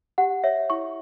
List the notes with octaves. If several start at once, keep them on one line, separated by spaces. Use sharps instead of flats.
G4 F#5
C#5 E5
E4 C#6